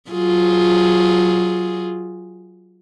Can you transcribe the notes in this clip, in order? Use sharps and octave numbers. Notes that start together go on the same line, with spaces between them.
F#3 F4 G#4